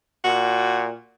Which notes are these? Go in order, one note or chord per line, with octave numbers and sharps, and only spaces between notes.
A#2 F#4